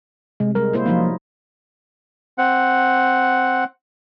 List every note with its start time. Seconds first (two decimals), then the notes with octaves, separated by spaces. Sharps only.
0.40 C3 G#3
0.55 G3 G#3 A#4
0.73 A#3 E4 C5
0.86 F3 F#3 A#3 D#4 F4
2.38 C4 F#5